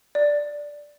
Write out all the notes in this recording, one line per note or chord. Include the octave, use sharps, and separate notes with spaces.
D5